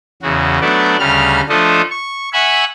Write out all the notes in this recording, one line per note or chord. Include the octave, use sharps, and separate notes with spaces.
E2 C#3 F#4
F#3 A3 B3 D4 D5
D2 C#3 G3 F6
F3 A3 D4 F4 A4 D#5
C#6
E5 F#5 G#5 B5 C#6